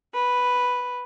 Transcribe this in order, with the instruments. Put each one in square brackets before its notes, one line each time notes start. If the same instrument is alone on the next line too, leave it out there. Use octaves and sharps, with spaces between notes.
[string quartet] B4